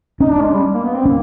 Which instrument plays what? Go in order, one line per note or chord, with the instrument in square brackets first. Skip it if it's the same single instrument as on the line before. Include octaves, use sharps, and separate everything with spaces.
[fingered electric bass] C#4 [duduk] D#4
[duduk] D4
G#3
G3
A#3
B3
C4
[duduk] A#3 [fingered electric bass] C#4